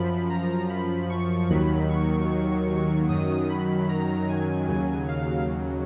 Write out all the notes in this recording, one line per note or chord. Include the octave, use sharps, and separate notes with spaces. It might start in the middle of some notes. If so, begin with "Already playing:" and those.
Already playing: F#2 F3 B5
A#5
B5
C#6
D#2 D#3 F#3 B5
C#6
F#2 D#3 F#3 D#6
B5
A#5
G#5
D#2 C#3 F#3
F5